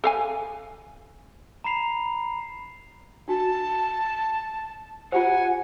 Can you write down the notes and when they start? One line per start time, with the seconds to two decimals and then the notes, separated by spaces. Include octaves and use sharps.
0.04 A4 F5 G#5
1.64 A#5 B5 C7 F7
3.28 D4 F#4 A5
5.12 F4 G4 C5 F#5 G#5